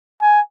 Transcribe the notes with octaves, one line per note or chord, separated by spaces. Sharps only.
G#5